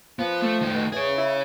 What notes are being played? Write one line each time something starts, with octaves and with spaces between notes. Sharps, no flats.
F3 B3
A3
D#3 A3
B2
E2 G#4 C#5
E4